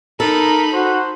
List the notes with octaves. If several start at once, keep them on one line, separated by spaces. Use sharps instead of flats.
D#4 A4 A#4 B5
F#4 C5